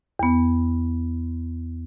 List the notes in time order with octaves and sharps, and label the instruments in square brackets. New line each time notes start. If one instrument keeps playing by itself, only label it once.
[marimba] E2 B3